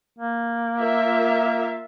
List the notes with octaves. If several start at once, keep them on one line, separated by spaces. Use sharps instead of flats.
A#3
F4 A#4 E5